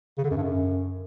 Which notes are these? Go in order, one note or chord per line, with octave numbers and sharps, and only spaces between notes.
C#3
D3
F#2
G2
F#2